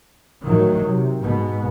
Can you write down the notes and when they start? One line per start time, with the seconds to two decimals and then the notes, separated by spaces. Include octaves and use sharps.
0.44 A2 D#3 F#3
0.86 C3
1.21 G#2 B2 B3